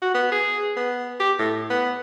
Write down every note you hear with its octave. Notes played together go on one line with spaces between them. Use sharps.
F#4
B3
G#4
B3
G4
A2
B3